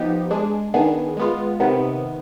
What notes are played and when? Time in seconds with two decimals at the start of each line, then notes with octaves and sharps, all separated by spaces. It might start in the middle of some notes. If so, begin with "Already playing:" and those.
Already playing: F3 B3 D#4 G4
0.31 G#3 D4 G#4
0.74 D#3 B3 D4 G#4
1.17 G#3 B3 F4
1.60 C3 D#3 B3